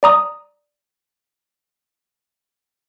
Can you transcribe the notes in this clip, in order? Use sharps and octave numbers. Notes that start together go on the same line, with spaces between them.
D5 A#5 D#6